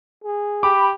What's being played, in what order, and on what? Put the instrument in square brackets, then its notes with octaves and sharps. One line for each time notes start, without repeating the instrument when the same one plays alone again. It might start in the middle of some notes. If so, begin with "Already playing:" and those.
[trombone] G#4
[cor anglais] G4 [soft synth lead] B5 [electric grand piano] D6